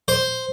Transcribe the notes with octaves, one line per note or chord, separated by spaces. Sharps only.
C5